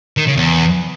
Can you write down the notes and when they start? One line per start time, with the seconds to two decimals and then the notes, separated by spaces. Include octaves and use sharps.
0.17 D#3
0.27 C#3
0.37 E2